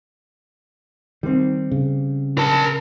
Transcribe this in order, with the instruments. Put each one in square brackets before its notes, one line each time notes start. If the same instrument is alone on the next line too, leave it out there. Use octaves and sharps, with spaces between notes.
[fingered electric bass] D#3 [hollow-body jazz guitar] G3 C4
[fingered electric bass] C#3
[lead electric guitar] A#4 A5